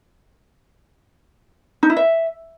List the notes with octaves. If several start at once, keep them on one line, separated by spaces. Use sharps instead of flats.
D#4
E4
E5